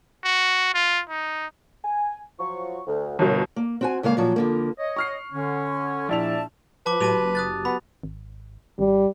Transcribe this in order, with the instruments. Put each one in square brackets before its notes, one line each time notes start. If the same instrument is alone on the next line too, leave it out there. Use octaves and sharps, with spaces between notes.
[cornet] F#4
F4
D#4
[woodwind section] G#5
F3 F#3 C#6
D2
[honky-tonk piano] G1 B2 [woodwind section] F#2
[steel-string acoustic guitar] A#3
C4 F#4 G#5
C#3 G#3 A#3 F5
A#2 F3 F#3
F2 D3 A#3
[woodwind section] C#5 D#5
[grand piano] C#6 F6 C7
[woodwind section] D3 C#4
[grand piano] A#1 E4 F7 [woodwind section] D5 E5 A5
[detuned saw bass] F3 [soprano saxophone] B4 [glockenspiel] A5 D6
[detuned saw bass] A2 [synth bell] F#3 F#4 G4 [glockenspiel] A5 D#7 F7
[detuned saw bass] F#1
[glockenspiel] D#6 F#6 A6
[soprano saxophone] B3 [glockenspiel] B5
[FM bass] G#1
[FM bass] G#1 [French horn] G3